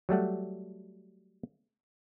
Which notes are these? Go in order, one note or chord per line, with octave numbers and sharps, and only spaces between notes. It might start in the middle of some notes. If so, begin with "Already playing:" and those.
F#3 G3 A3 F#5